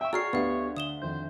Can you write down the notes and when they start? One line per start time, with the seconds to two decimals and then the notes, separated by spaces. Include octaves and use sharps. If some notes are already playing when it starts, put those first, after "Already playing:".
0.01 E5 G5 C#6
0.13 F#4 G#4 C#5 D5 A#5 F6 C7
0.33 D2 B3 G4 B4 D5 F5
0.77 D3 D#6 E7 G7
1.02 F2 D#3 C5 G6